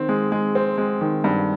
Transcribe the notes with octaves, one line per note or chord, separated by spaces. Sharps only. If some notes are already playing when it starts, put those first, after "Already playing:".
Already playing: D#3 C4
G#3
G#3
C4
G#3
D#3
G2